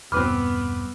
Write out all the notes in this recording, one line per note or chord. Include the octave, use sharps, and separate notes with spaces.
E1 G2 B3 C4 B4 B5 D6 F6